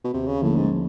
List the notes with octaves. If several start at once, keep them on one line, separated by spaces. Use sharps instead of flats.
B2
D#2 C3
C#3
A2 D3 F3 A#3 C#4
G#2